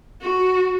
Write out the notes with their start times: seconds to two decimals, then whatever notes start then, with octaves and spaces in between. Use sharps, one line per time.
0.22 F#4